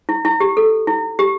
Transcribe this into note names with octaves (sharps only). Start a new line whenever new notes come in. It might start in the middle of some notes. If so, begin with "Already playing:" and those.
E4
E4
G4
A4
E4
G4